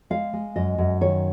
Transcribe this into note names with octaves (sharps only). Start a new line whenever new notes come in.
G#3 F5
G#3
F#2 D#5
F#2
D#3 C#5